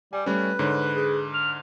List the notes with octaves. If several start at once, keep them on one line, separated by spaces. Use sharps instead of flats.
G3 G#5
G3 A3 C#4 B4
G#2 D3 C#5
G#4
F6